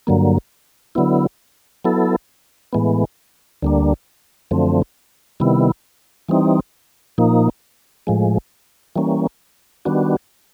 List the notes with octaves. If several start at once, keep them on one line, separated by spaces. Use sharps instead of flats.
G2 D3 F#3 A#3
D3 F#3 B3 E4
F#3 B3 E4 A4
A2 E3 G#3 B3
D2 D3 G3 A#3 D4
F#2 D3 F3 A3 C4
C3 D#3 G3 B3 E4
E3 G3 C4 D#4
A#2 F3 A#3 D#4
A2 F3 G#3
E3 G3 A#3 C#4
D#3 G3 B3 D4 F#4